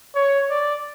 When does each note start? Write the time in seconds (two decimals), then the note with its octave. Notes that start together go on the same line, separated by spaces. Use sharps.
0.15 C#5
0.50 D5